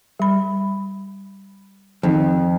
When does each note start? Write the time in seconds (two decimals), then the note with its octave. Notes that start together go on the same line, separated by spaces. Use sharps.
0.20 G3 B5
2.03 F2 D#3 D#4